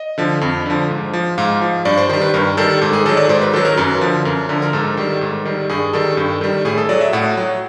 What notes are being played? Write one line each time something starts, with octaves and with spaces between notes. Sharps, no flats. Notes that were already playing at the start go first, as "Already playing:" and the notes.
Already playing: D#5
D3 F3
F2
D3 F3
G#2
F3
G#2 F5
F3
G2 D5
C5
D#3 G3
B4
G2 A#4
D#3 G3 A4
G#2 A4
G#4
D#3 F#3 A4
D5
G#2 C5
B4
D#3 F#3 A4
A#4
F#2 B4
D3 F3
F#2 A#4
D3 F3
A#4
G#2 A4
D#3 G3
G#2
D#3 G3
G2 G#4
D#3 G3 A4
G2
D#3 G3
A2 G#4
A4
F#3 D5
E5
A2 F#5
F#3